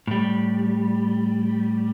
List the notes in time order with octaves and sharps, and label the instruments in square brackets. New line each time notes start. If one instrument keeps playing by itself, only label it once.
[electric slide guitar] A2 G3